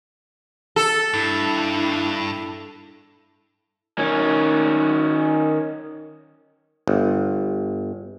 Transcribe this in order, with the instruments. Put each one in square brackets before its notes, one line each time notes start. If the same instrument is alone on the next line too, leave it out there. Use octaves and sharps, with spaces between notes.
[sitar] A4
[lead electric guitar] G2 [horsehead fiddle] D4 E4
[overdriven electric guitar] D#3 C#4
[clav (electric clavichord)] G1